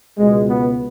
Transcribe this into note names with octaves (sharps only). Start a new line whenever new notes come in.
C#2 B2 G#3
B3